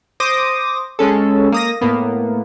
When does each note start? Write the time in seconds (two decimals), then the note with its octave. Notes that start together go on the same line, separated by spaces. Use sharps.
0.20 C5 D6 D#6 A#6
0.99 G#3 C#4 A4
1.52 A#3 D#6 A#6
1.81 A2 A#3 B3